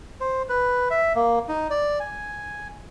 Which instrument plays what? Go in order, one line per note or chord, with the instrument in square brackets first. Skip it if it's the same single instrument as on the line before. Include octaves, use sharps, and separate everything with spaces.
[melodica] C5
B4
E5
A#3
D#4
D5
G#5